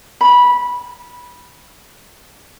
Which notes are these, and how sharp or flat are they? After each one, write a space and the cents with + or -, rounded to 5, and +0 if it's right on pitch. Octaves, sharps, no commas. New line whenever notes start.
B5 -15